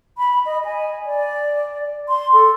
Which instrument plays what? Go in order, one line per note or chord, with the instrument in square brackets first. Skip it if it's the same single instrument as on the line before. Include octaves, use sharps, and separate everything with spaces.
[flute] B5
D#5
G#5
D5
C6
A4